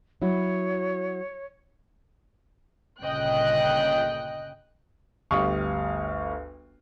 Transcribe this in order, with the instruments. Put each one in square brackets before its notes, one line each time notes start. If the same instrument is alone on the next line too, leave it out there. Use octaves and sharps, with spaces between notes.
[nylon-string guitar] F#3 E4 F#4 [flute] C#5
[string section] G1 A#2 C#3 D#5 G5 F#6
[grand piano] G1 D2 G4 F5 C#6 D#6